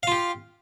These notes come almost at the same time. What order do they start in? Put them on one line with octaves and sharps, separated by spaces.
F5 F4 G4